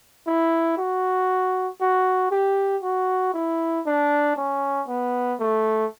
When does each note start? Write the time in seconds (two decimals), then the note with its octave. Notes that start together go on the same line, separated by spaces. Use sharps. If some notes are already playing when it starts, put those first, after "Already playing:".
0.27 E4
0.78 F#4
1.81 F#4
2.31 G4
2.83 F#4
3.34 E4
3.86 D4
4.36 C#4
4.88 B3
5.40 A3